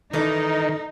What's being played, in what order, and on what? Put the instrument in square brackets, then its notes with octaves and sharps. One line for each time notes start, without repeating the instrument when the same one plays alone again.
[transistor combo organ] D#3 [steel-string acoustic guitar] E3 A4 D5 [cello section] D#4